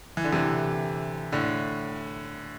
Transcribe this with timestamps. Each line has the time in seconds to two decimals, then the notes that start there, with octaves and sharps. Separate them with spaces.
0.17 E3
0.24 D3
0.32 C3 E3
1.32 A2 D3